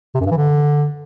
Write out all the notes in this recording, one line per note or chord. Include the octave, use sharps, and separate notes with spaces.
C3
F#2
G2
E3
D3